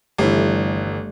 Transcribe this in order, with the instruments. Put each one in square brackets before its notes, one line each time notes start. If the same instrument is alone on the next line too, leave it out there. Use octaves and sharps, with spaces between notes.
[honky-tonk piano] G1 E3 [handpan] D#3 G3 A3